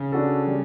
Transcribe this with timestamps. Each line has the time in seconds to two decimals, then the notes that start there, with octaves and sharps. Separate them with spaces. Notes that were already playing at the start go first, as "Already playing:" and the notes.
Already playing: C#3
0.12 D4 F#4 A4
0.47 G3